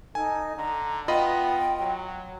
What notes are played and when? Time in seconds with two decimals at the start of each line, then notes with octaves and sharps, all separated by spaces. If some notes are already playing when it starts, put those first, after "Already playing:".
0.15 D#4 A4 G#5
0.57 D3 A#5
1.08 B3 F4 D#5 G5 B5
1.79 F#3